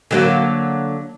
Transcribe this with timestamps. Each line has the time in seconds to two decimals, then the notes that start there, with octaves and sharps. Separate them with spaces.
0.11 D3 F#3 A#3